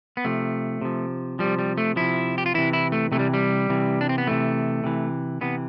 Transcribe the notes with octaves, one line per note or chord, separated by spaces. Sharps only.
B3
C3 F3 A3
C3 F3
C3 F3 G3
G3
A3
C3 F3 E4
G4
F4
C3 E3 E4
E4
A3
C3 E3 G3 A3
G3
C3 E3
D4
C4
B3
C3 E3 A3
C3 E3
C3 E3 B3